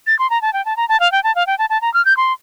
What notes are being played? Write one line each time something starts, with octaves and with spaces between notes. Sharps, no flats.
A6
C6
A#5
A5
G5
A5
A#5
A5
F5
G5
A5
F5
G5
A5
A5
A#5
F6
G6
C6